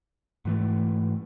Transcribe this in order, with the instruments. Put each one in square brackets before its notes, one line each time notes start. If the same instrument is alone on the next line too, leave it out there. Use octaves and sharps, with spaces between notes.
[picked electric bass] G#2 E3 A3